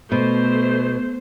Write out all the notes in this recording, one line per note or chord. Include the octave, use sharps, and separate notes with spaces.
B2 A3 C5